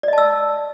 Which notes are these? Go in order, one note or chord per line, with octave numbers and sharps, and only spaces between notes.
D5 D#5 A5 E6